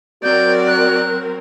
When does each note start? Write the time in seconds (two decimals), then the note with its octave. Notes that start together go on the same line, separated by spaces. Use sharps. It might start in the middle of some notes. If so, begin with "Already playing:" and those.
0.23 F#3 C4 F#4 A#4 D5 G6
0.68 F#6